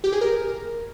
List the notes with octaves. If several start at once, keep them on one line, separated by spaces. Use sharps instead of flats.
G4
G#4
A#4